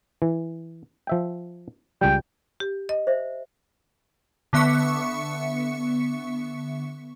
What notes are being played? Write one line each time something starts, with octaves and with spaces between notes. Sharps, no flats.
E3
F3 E5 G5
C#2 G3 G5
G4
D#5
C5 E5
D3 B3 E5 C#6 C#7